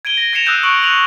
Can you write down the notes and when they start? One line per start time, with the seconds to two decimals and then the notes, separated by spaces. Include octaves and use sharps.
0.05 G#6 D7 D#7 G7
0.17 A#6
0.33 G#6 A#6 C7 C#7 E7 F7
0.46 D#6 E6 F#6 G6 D#7
0.63 C#6 F#6 G6 D7 F#7
0.83 F#6 C#7 F7 F#7